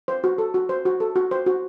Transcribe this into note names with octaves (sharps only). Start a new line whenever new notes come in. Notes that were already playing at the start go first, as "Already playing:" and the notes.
C5
F#4
A4
F#4
C5
F#4
A4
F#4
C5
F#4